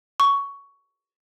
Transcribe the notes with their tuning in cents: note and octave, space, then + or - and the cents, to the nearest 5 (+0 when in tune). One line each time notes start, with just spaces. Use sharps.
C#6 +15